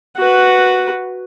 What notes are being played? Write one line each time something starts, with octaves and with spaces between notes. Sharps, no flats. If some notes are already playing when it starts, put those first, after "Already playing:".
F#4 B4